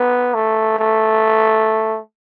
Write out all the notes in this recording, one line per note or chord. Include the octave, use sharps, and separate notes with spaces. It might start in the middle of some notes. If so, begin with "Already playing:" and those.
Already playing: B3
A3
A3